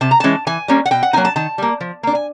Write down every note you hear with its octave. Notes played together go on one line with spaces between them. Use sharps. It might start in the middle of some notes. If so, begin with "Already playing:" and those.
C3 A5
A#5
E3 G#3 C#4 A5
E3 G#5
G3 A#3 C#4
F#5
B2 G5
F#5
F#3 A#3 D#4 G#5
A5
D#3 A5
G3 A#3
F3
A#3 D4
G#5